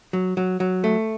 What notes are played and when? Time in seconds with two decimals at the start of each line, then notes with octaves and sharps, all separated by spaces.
0.13 F#3
0.37 F#3
0.60 F#3
0.84 A3